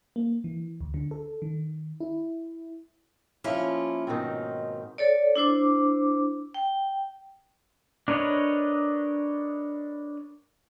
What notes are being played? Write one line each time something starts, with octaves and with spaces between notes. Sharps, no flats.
A#3
E3
D2
D3
A4
D#3
E4
F3 A#3 C#4 E4 F4
G#2 B2 D#3 C4 D#4
A4 C#5 D5
D4 E4 C5 D6
G5
D4 A#4 B4 C#5 D#5